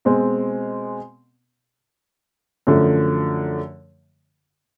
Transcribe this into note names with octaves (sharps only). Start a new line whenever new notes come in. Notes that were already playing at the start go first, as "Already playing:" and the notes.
B2 G#3 C4
F#2 D3 F3 A3